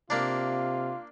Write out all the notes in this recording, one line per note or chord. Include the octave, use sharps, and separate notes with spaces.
C3 A#3 D4 F4